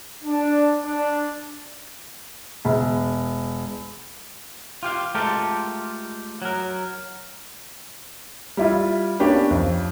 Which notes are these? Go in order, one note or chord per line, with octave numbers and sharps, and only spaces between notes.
D4
D4
E1
F4 G4 F5
G#3 A3 F4 G4 A4 A#4
F#3 A#4
G3 E4 F4
A#3 B3 C#4 D4 G4 B4
F2